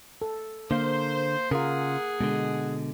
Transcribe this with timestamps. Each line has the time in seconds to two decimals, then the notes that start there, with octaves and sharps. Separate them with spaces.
0.22 A4
0.71 D3 A#3 C5 F5
1.51 C#3 F4 G#4 A#4 F#5
2.21 B2 D3 G#3